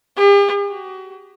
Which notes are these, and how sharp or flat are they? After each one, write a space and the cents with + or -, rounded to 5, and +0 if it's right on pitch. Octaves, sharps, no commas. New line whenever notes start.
G4 +45
F#4 +35